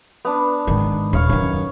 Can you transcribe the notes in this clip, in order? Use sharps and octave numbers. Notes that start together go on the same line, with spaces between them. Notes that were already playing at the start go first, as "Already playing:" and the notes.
B3 D4
G#2 D#3
D#1 C#5 F5 C#6
F#2 D#3 C#5